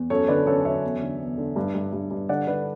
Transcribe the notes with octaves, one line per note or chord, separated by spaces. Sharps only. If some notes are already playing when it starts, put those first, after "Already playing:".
Already playing: E2
F#2 A4 C#5
D3 B4 D5
F#2 A4 C#5
F#2 C#5 E5
E2
D3
E2
D3
G2
G2
G2
G2
D3 D5 F#5
D3 B4 D5